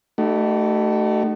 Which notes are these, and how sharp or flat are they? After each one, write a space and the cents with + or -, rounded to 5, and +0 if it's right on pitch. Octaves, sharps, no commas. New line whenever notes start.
A3 +0 D#4 -35 F#4 +45